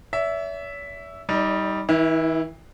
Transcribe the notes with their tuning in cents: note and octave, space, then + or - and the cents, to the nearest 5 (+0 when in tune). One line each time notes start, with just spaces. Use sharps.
C#5 +45 E5 +0
G3 +0 D#4 +20 D5 -20
E3 -45 E4 +0